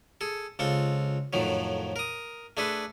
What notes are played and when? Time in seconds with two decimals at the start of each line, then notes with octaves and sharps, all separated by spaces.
0.21 G#4 A4
0.59 C#2 C4 F4 A4
1.33 F2 A2 D#3 F3 F#3
1.96 A#4 D#6
2.57 A3 D4 G#4 A4 B4